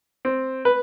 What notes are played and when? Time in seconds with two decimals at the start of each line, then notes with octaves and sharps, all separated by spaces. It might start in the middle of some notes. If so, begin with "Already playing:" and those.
0.25 C4
0.65 B4